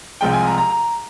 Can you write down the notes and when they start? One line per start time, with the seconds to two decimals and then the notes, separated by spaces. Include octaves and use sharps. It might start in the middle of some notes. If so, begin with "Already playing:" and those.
0.21 C2 C3 F3 G#3 G5
0.33 G#5
0.46 A#5
0.58 A#5
0.70 A#5